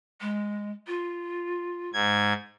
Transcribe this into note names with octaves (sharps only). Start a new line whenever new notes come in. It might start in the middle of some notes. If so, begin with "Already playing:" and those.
G#3
F4
G#2 G#6